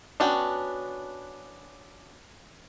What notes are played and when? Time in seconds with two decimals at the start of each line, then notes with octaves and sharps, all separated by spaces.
0.20 B3 C#4 D4 F#4 G5